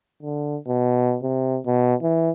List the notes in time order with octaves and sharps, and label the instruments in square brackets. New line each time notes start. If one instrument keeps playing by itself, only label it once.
[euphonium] D3
B2
C3
B2
E3